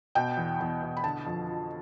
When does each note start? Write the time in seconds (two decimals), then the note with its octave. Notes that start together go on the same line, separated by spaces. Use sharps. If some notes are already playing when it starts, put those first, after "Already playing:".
0.15 B2 G5
0.37 E2
0.60 E2
0.83 B2
0.97 B5
1.04 D3 A5
1.26 F2
1.49 F3